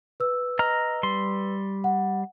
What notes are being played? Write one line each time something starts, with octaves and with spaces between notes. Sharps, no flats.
B4 E6
D#5 A#5 F6
G3 C6
F#5